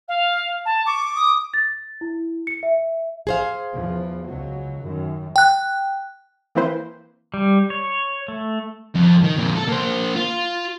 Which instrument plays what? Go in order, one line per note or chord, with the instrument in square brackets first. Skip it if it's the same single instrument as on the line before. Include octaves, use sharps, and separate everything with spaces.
[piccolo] F5
A5
[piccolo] C#6 [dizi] D6
[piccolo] D#6
[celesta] A6
E4
C#7
E5
[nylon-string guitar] G#4 C5 F5
[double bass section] E2 E3 F3
C#2 F#3
F#2 D#3
[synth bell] G5 F#6
[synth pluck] E3 A#3 C4 E4 B4 C5
[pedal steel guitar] G3
C#5
A3
[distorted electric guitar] F2
D#3
F2 A#2
A4
A#3 C5
F4